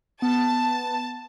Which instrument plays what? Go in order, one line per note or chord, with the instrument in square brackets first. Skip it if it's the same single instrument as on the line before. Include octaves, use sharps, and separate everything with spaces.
[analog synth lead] B3 [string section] A5